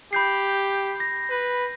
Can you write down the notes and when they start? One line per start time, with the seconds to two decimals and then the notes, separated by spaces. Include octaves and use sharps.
0.13 G4 B5 G6 C7
1.00 A#6
1.30 B4